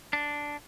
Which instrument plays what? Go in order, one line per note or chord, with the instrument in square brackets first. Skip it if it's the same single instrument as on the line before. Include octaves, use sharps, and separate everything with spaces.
[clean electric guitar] D4